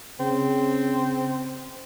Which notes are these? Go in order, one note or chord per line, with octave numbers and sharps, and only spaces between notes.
C#3 C4